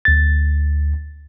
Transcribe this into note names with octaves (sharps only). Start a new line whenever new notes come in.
D2 A6